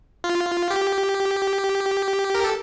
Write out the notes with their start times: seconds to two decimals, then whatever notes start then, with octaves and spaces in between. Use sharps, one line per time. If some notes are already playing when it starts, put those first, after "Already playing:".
0.24 F4
0.70 G4
2.34 A#4
2.44 A4